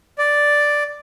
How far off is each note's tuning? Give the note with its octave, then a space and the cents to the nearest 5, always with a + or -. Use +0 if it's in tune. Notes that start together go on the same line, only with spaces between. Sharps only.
D5 +0